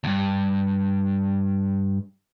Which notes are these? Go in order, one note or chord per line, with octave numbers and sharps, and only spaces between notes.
D2 G2